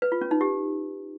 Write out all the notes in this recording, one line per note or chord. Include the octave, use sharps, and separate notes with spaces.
B4
F4
C#4
D#4
G4